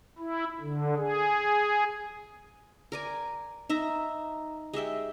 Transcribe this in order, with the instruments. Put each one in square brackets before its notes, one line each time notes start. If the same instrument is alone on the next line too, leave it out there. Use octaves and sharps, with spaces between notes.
[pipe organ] E4
D3
G#4
[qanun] A#4 D5 G#5
D#4 E5 A#5
G#3 G4 E5 G5